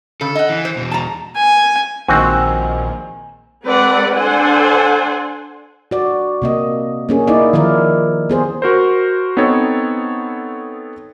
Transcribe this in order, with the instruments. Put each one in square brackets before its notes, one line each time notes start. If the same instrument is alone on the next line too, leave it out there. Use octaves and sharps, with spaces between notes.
[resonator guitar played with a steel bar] C#3 [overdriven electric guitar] A4
[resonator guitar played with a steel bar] D#5 F#5
[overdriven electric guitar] E3
[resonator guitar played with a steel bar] C5
[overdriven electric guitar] E2 B2
[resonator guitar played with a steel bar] A5 A#5
[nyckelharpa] G#5
[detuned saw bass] A#1 [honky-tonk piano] A#2 D#3 G#3 [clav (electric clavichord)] C4 F#4 [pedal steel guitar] G#5 E6
[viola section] G#3 C4 A#4 B4 D5 F#5
D4 A4 C5 F#5 G#5
[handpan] F#4 D5
C3 A#3 D#5
A#3 C#4 G#4
A#3 D#4 E4 D5
D#3 F3 E4 A#4 D5
B3 G#4 C5
[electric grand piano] F#4 A#4 C5
B3 C4 D#4 A4 C#5